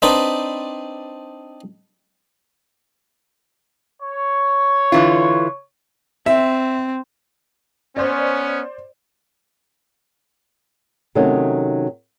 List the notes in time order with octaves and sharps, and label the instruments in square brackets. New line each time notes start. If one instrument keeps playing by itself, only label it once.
[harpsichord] C4 D4 D#4 B4 D5
[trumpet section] C#5
[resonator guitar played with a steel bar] D3 E3 F4
[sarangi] C4 [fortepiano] E5
[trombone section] B3 C#4 [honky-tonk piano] C5 D5
[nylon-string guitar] C3 D#3 F#3 A3 C#4 D#4